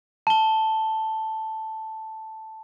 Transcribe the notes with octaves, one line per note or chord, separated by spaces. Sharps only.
A5 G7